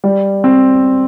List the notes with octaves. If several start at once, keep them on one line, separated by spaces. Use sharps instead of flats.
G3
C4